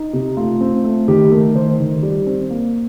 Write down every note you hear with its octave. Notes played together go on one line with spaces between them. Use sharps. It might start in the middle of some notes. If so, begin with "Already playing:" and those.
Already playing: D#4
C3
A3 F4
C4
A3
D#3 G4
A3 A#4
D#3 C5
D#3
G3
C4
A#3